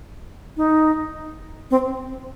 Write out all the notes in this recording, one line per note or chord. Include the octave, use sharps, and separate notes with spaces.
D#4
C4